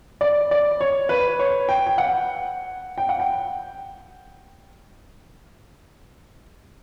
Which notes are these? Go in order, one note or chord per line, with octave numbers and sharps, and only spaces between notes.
D5
D5
C#5
B4
C#5
G5
G5
F#5
G5
F#5
G5